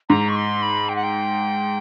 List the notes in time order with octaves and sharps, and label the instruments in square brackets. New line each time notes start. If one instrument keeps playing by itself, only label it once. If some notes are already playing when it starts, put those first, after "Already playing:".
[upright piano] G#2 [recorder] A#5
[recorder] C#6
C6
B5
G5
F#5
G5